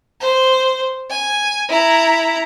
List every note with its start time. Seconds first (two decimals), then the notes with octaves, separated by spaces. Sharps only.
0.20 C5
1.10 G#5
1.69 E4 A#5